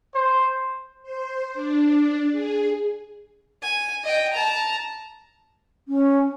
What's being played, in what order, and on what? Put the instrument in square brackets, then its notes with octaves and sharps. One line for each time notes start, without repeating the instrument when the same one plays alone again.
[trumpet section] C5
[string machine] C5
D4
G#4
[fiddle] G#5
D#5 G5
A5 A#5
[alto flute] C#4